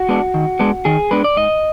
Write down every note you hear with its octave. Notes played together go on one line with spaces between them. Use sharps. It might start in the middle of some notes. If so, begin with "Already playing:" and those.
Already playing: F#4
G#3 B3 D4
D#3
G#3 B3 D4
D#3 G#4
G#3 B3 D4 B4
D5
G#2 D#5